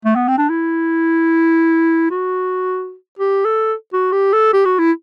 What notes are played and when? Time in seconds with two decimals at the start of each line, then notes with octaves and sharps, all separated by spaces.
0.05 A3
0.16 B3
0.28 C4
0.38 D4
0.50 E4
2.11 F#4
3.19 G4
3.45 A4
3.93 F#4
4.12 G4
4.33 A4
4.54 G4
4.65 F#4
4.79 E4